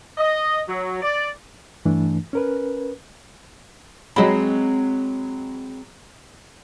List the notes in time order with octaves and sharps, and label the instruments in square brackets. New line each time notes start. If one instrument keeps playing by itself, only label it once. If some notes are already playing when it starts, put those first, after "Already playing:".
[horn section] D#5
F#3
D5
[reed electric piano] G2 E3 A3 D4
C#4 A#4 B4
[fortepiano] F#3 G#3 B5 [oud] C4 D#5